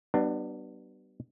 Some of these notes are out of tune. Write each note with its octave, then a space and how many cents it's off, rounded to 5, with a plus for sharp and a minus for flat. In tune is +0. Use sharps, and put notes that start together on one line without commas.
G3 -35 B3 +0 D4 +35